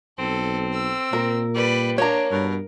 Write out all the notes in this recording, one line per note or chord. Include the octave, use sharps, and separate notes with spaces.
B1 C4 A4
E6
A#2 A#4
G3 B4 D5
A#3 D4 C#5 A#5
G2 B2 A#4